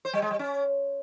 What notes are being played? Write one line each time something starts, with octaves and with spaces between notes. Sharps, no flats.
C5
G3
G#3
G3
C#4